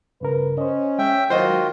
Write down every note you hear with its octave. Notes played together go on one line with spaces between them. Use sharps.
G2 C#3 A#4 B4
C#4 C5 D#5
G#3 E5 G5
D#3 F#3 F4 F#4 C5 D#5